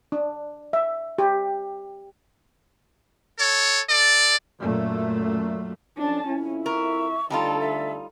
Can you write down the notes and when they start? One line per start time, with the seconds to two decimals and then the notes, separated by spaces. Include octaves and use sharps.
0.12 D4
0.73 E5
1.18 G4
3.38 A4 C#5
3.88 A4 D5
4.60 F#2 A#2 A3
5.98 F2 C#4 D4 A5
6.27 F2 C#4 E4
6.66 A#4 E5 C#6
7.30 D2 D3 G3 D#4 F4 A4 A5
7.61 E5